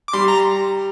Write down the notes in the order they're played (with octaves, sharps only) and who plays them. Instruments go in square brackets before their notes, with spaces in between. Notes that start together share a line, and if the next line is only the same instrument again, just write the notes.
[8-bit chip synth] D6
[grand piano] G3 [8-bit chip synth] C6
[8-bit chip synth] A#5